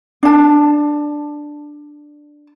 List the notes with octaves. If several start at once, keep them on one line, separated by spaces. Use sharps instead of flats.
D4 A5